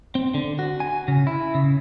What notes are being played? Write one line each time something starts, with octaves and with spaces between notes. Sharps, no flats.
C4
D3
F#4
G#5
C#3
E4
C#3